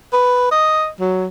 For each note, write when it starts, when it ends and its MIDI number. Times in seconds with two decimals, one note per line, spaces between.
0.13 0.49 71
0.51 0.88 75
1.00 1.27 54